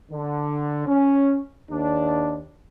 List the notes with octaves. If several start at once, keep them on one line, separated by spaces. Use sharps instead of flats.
D3
C#4
D#2 D4